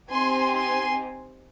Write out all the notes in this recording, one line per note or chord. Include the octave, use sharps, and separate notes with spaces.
C4 D#4 G4 G#5 C6
G#5 C6